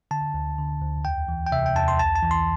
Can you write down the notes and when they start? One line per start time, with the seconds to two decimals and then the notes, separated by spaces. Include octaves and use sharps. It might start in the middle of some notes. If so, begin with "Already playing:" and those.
0.11 D3 A5
0.34 D2
0.58 D3
0.81 D2
1.05 E2 G5
1.28 E3
1.47 G5
1.52 C3 E5
1.66 G5
1.76 E2 A5
1.88 C6
1.99 C2 A5
2.16 A5
2.23 E3
2.31 C6